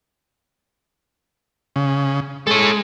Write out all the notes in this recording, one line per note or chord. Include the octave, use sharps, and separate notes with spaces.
C#3
G#3 A4 C#5